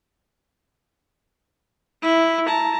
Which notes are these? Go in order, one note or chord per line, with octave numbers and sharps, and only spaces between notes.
E4
A5 A#5